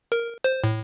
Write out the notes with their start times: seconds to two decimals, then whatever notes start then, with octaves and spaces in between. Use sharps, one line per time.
0.12 A#4
0.44 C5
0.64 A2